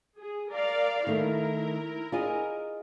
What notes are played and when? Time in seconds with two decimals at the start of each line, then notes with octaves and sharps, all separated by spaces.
0.20 G#4
0.51 A#4 D5 F5
1.07 D#3 A3 E4 A#4
2.12 F4 G#4 D#5